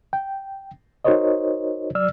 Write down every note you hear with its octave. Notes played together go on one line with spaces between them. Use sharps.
G5
D#4 F#4 A#4 C5 C#5 D#5
F#3 D5 E6 F6